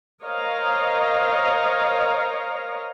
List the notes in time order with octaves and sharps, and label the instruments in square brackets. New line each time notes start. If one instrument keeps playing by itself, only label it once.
[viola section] A#4 C5 C#5 D#5 F5 A#5